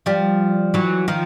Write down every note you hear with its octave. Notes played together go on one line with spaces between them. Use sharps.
F3 G3
E3 F#3
D#3 F3